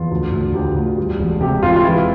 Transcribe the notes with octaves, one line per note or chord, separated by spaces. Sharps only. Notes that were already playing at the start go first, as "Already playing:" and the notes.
Already playing: E2 F4
D2
D2
D2 G4
D2
G3
E1
C3 G4
E1 F4
F4
E3 E4